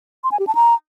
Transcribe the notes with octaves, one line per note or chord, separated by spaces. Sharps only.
C6
G#5
G4
A5
A#5